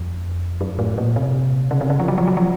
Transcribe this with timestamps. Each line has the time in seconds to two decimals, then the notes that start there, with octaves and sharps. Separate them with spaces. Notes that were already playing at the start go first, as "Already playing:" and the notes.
Already playing: F2
0.61 F#2
0.79 A2
0.98 A#2
1.16 C3
1.71 C#3
1.81 C3
1.90 C#3
2.00 F3
2.08 F#3
2.18 F3
2.27 F#3
2.37 F3